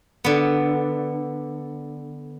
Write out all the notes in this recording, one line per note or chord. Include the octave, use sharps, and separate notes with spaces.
D3 B3